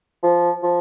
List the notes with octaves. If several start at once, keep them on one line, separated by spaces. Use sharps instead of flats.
F3
F3